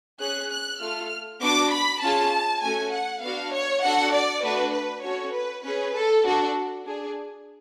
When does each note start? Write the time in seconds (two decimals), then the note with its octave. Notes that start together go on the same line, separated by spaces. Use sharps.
0.20 C#4 G#4 F#6
0.51 F#6
0.80 A3 F4 A4 F6
1.41 B3 D4 F#4 D6
1.72 B5
2.01 C#4 F4 G#4 A5
2.62 A3 C#4 F#4 A4 G#5
2.92 F#5
3.22 B3 D4 F#4 F5
3.53 C#5
3.83 D4 F#4 A4 F#5
4.13 D5
4.43 A3 D4 F#4 B4
4.73 B4
5.03 C#4 F#4 A4 C#5
5.34 B4
5.64 C#4 G#4 B4
5.94 A4
6.24 D4 F#4 A4
6.85 D4 G#4